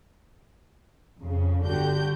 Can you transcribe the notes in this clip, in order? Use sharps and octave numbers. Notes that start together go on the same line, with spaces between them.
F2 C#3
G1 D3 F#4 G4 G6